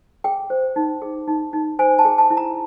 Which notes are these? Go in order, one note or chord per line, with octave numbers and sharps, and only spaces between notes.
G#4 G5
C5
D#4
G#4
D#4
D#4
C5 G#5
A5
G#4
A5
E4
A#5